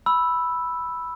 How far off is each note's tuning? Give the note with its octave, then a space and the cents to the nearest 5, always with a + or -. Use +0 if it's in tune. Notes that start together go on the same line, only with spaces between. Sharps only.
B5 +0 E6 +0